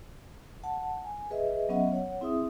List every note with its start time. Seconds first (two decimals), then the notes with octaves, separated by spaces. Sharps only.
0.64 F#5 A5
1.05 G#5
1.31 G#4 B4 D#5 E5
1.69 F#3 B3 C#4 D#5 E5 F#5
1.92 C#5 F#5
2.21 C4 E4 G#4 E5 D#6